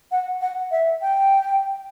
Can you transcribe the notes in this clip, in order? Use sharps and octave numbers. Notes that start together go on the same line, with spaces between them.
F#5
F#5
E5
G5